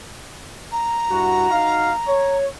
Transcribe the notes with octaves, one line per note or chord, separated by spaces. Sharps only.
A#5
G2 E4 F#4
D#4 F#4 F5
C#5